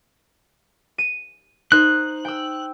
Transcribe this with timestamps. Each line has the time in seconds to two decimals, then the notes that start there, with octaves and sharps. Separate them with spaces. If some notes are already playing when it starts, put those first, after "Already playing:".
0.98 D#7
1.72 D#4 C5 F#6
2.25 G5 E6